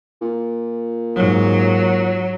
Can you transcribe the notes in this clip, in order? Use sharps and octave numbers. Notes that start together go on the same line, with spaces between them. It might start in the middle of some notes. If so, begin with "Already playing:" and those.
A#2
G#2 F#3